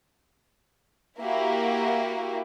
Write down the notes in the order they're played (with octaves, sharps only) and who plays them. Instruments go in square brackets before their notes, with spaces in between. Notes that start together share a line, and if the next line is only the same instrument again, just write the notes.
[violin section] A#3 E4 F#4 G4